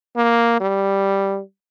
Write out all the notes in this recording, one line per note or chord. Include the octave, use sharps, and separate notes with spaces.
A#3
G3